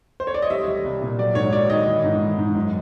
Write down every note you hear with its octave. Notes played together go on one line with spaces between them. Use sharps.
C5
C#5
D5
D#5
G3 E5
G3
C2
A#2
F#3 D5
G#2 C#5
F#3 D5
D#3 D#5
E3
G#2
E3
G#2
F#2